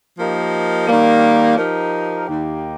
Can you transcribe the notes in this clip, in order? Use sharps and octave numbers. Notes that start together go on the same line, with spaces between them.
F3 A#3 D#4 G4 A#4
D#3 G3 A#3
F3 D#4 G4 A#4
D#2 D#3 A#3 D#4 G4